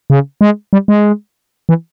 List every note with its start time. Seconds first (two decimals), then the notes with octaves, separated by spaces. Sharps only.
0.10 C#3
0.41 G#3
0.73 G3
0.88 G#3
1.69 E3